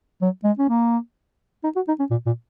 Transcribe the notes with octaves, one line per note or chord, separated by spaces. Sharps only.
F#3
G#3
C#4
A#3
D#4
F#4
D#4
C#4
A#2
A#2